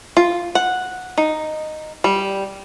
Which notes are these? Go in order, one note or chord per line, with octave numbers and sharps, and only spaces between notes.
F4
F#5
D#4
G3